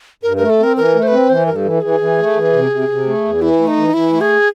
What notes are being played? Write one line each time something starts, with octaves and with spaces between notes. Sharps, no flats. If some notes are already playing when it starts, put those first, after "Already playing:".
G2 A#4
A3 A#4
A4
C4 A#4
E3 A#4
A3
C5
C4 B4
E3 C5
G2 A#4
A4
E3
E3 G#4
E3
A3
E3
C3
C3
C3
A3
E2
E3 E4
A3
D#4
E3
E3 E4
A3
G#4